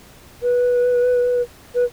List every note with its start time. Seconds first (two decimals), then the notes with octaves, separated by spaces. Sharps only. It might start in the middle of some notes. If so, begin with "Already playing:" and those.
0.43 B4
1.75 B4